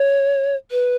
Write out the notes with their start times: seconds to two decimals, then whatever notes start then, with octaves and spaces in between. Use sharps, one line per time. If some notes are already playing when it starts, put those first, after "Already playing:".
Already playing: C#5
0.71 B4